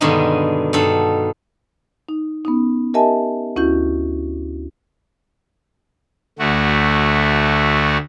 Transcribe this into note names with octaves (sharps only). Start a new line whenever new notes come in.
G2 B2 D3 D#3 G#3 D#4
G2 D#4 A4 F#5
D#4
B3 C#4 D#4
G4 A#4 D#5 E5 G#5 A5
D2 C#4 E4 F#4 G6
D2 A3 F#4